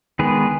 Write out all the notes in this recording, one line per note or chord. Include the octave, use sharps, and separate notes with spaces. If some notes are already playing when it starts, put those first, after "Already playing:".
D#3 G#3 B3 G#4 B4